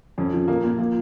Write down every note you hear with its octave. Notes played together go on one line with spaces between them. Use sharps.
F2 C#4
F3
A#2 A#3
A#2
F3 A#3